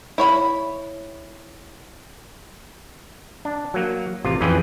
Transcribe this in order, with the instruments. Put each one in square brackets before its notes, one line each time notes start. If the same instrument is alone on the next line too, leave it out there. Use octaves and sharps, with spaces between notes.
[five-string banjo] E4 C#5 B5
[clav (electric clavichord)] D4
F#3 A#3
A1 C3 F4
F2 E3 C#4 G#4 B4 G5